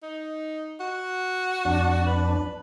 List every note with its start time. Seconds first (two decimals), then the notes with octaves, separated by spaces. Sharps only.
0.03 D#4
0.80 F#4
1.65 F2 D4
2.06 B4